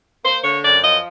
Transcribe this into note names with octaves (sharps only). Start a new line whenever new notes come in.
A#3 C5
D3 C#5
F#2 D5
F3 D#5